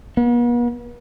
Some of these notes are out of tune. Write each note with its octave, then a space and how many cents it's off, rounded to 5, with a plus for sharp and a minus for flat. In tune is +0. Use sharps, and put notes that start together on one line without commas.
B3 -45